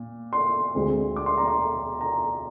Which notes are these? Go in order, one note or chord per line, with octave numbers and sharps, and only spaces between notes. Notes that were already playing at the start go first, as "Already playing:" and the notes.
Already playing: A#2
C6
D2 D3 G#3 C4
D6
C6
A#5
C6
A#5